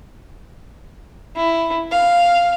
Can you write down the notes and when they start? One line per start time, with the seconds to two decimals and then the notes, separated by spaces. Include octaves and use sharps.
1.36 E4
1.92 F5